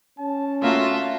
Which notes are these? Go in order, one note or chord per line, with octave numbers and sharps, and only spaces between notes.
C#4 A5
A3 A#3 F4 F#4 E5